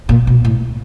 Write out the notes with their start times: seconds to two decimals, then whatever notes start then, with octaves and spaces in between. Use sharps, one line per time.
0.09 A#2
0.27 B2
0.45 A2